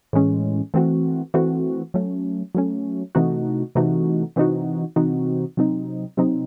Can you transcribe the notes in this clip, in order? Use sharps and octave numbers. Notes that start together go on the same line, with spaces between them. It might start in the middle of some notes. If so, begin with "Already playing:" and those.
A2 E3 G#3 C#4
E3 A3 C4 F#4
E3 A3 C4 F#4
F#3 A3 C#4
F#3 A3 C#4
C3 E3 A3 D#4 F#4
C3 E3 A3 D#4 F#4
C3 E3 C4 D#4 F#4
C3 E3 C4 D#4 F#4
C3 F#3 C4 D#4
C3 F#3 C4 D#4